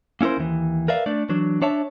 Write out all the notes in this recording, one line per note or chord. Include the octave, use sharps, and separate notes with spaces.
A#3 C#4 E4 A#4 C5
D#2 E3
A#4 B4 D5 E5 F5
A3 D4 D5
E3 F#3 D4
D4 C#5 E5 A5